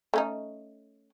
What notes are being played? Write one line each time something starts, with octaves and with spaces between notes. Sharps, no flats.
A3 C#4 D#4